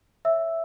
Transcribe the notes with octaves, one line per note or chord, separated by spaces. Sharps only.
C#5 E5 E6